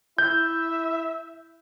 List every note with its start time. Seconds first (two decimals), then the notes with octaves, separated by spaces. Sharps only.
0.18 E4 E5 G6